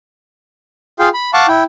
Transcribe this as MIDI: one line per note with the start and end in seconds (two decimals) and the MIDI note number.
0.99 1.09 65
0.99 1.09 68
0.99 1.09 77
0.99 1.09 79
0.99 1.09 84
1.14 1.31 83
1.34 1.47 77
1.34 1.47 78
1.34 1.47 81
1.34 1.47 85
1.34 1.47 86
1.48 1.63 64
1.48 1.63 79